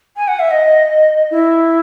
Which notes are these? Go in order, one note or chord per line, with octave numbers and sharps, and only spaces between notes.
G#5
F#5
E5
D#5
E4